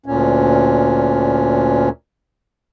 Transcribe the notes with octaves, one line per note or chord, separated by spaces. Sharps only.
D2 A#2 C#4